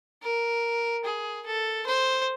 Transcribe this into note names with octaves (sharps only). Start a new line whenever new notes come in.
A#4
G#4
A4
C5